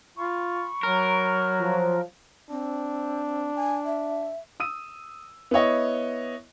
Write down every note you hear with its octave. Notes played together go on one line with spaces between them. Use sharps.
F4 B5 C#6
F#3 A#4
F3
C4 D4
G#5
E5
D#6 E6 D#7
B3 E4 C#5 D#5